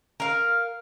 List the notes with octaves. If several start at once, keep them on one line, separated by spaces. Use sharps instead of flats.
A#4 F5